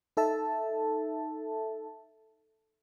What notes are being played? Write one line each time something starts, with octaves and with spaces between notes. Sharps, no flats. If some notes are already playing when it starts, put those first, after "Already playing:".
D#4 A4 E5 A5